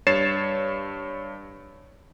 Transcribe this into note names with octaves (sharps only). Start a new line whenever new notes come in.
G2 C#5 A6 C7 E7